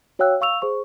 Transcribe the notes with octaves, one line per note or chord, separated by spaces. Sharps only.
F#4 C#5 F5 G5 E6 F#6
F5 C#6 E6 F7
G#4 C5 C#6